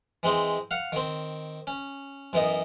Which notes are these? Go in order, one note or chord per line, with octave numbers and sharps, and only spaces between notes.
E3 G#3 C4 D#4
F5 F#5
D#3 C4
C#4
F#2 E3 B3 D#4 D#5